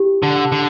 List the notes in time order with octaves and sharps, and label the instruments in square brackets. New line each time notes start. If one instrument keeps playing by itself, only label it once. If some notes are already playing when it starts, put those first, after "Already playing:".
Already playing: [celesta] E4 G4
[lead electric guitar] D3
[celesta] F#5
[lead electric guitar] D3